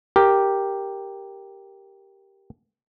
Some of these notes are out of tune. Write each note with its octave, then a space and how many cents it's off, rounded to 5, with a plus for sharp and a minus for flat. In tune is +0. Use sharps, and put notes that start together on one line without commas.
G4 +0 A#4 +0